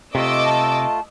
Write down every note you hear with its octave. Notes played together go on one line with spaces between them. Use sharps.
C3 A3 F4 D#5 D6 E6
A5